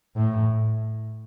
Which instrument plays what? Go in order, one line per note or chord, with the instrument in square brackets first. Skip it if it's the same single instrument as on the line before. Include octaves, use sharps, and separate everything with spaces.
[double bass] A2